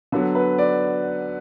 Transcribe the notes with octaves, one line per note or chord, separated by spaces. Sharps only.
D3 F#3 B3 B4
B4
D5